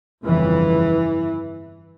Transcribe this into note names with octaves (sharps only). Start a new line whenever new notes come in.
G1 F2 C#3 E3